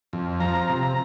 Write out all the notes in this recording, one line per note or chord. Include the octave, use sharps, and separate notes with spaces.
F2
F3 A#5
C3